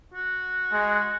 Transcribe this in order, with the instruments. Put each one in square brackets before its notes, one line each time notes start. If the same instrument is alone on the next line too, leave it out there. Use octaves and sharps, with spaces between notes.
[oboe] F#4
[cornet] G#3